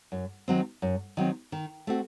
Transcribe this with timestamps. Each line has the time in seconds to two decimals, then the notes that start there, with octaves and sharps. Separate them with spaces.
0.12 F#2
0.48 D#3 F#3 C4
0.82 F#2
1.17 D#3 F#3 C4
1.52 D#3
1.87 A3 C4 F#4